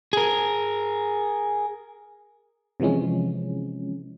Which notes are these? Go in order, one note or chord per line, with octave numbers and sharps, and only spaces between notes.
G#4 A#4
C3 E3 F3 G#3 C#4